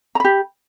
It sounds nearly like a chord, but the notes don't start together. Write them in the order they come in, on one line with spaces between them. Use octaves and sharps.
A#5 B5 G4